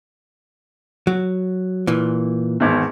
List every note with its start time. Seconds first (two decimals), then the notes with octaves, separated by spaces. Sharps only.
1.07 F#3
1.87 A#2 E3
2.60 G#1 E2